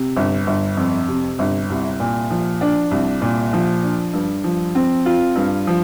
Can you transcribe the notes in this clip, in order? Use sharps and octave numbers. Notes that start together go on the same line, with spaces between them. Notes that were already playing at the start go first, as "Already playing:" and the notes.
Already playing: C3
G1
G1
F2
C3
G1
C2
A#2
F3
D4
C2
A#2
F3
D4
G2
F3
C4
F4
G2
F3